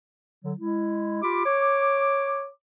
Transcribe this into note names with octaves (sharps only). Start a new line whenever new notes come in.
D3 F#3
G#3 E4
F4 G4 B5 D6
C#5 D6